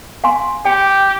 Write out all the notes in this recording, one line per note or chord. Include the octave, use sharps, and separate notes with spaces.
F5 G#5 C6
G4 G5